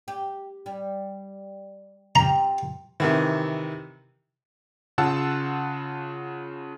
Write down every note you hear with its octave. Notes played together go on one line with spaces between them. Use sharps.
G4
G3
C4 F4 G4 A#5
C3 D#3 E3
C#3 F4 F#5 A5 E6